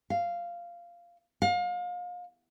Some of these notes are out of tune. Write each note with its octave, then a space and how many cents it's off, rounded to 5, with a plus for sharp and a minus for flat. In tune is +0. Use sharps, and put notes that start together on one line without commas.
F5 -10
F5 +35